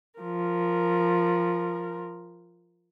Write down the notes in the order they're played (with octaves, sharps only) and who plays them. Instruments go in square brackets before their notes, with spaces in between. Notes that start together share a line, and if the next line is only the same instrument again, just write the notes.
[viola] F3 A#4